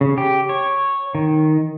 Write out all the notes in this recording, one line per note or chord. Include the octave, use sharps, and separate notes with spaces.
C#3
G4
C#5
D#3